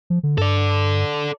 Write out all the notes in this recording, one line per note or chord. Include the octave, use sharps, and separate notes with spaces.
F3
D3
G2 A4 D5